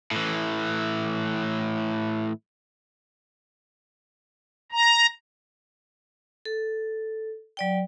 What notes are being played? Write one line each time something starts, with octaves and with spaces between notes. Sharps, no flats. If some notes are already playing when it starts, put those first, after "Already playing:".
A2 E3
A#5
A4
F#3 D5 G5